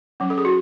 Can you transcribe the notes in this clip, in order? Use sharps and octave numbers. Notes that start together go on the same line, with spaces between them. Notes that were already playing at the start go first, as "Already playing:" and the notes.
F#3 C#4
A4
G#4
F#4